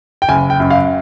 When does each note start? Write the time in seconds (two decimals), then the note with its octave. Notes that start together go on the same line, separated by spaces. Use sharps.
0.22 G5
0.29 F#1 G#5
0.50 G5
0.60 F#2
0.70 F5